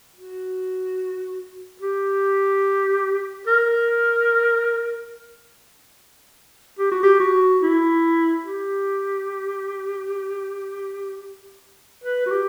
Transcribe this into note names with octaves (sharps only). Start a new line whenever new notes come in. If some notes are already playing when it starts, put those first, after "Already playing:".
F#4
G4
A#4
G4
F#4
G4
F#4
E4
G4
B4
F#4
G4